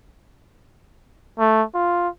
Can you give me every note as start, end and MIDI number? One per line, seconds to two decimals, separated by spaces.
1.39 1.63 57
1.75 2.08 65